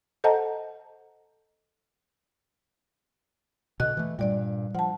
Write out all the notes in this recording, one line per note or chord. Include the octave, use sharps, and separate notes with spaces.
A4 C5 D#5 F#5 A5 A#5
B2 D3 D#5 F#6
E3 A3
G2 A#2 G3 D5
F3 F#5 A5